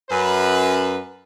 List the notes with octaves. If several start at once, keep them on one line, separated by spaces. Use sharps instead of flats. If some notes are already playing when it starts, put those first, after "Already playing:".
F#2 B4